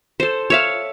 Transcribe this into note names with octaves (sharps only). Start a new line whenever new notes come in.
A4 C5
C#5 E5 F5